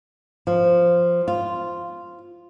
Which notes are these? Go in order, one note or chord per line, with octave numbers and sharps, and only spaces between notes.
F3
F4